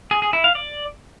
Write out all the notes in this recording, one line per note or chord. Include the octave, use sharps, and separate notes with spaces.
G#4
G#4
E4
F5
D5